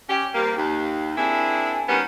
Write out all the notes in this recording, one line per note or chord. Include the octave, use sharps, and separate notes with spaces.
C#4 G4
C3 G3 A#3
D#2
A#3 C4 D4 E4 G#4
D#3 G3 A#3 B3 C#4